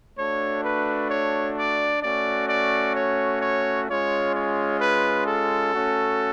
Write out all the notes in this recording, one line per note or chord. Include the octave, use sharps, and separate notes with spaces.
A3 D4 F#4 C#5
B4
C#5
D5
A3 C#4 F#4 D5
D5
C#5
C#5
G#3 C#4 F4 C#5
C#5
B4
A4
A3 C#4 F#4